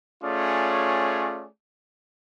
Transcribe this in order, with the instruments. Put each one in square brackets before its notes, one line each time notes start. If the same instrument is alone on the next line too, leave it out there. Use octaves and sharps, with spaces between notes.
[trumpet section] A3 C#4 F4 G#4 C#5 D5